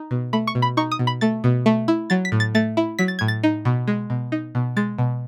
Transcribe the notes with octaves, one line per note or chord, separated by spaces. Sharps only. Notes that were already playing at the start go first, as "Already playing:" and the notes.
Already playing: D#4
B2
A3 B5
C#6
B2
B5
D#4 C#6
D#6
B2
B5
A3 A6
B2
A3
E4
F#3 A6
B6
A2
A6
A3 A6
E4
F#3 B6
A6
A2 G#6
A6
D#4
B2
G#3
B2
D#4
B2
G#3 A6
B2